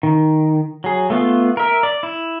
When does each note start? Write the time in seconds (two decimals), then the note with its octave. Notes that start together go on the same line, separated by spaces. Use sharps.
0.03 D#3
0.84 F#3 G#4
1.10 A3 B3 F4
1.57 A#4 E5
1.83 D5
2.03 E4